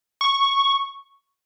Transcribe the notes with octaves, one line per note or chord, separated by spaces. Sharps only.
C#6